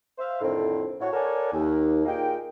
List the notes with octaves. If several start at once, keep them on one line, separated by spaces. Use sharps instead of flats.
C5 E5 F5
F2 A2 D3 D#3 A3 C4
A2 F#4 C#5
A4 A#4 C#5 D5 F#5 G#5
D#2
A#2 A#3 D#4 G#4 G5